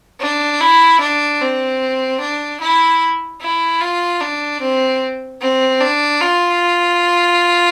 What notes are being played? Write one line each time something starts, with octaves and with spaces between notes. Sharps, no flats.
D4
E4
D4
C4
D4
E4
E4
F4
D4
C4
C4
D4
F4